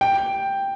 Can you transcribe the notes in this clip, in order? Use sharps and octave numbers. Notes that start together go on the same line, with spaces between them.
G5